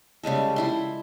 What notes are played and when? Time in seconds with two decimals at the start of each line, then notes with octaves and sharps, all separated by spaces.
0.23 C#3 G3 G#3 A4
0.56 F3 E4 C6